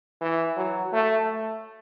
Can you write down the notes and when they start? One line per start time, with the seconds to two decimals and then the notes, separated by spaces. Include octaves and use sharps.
0.21 E3
0.56 F#3
0.93 A3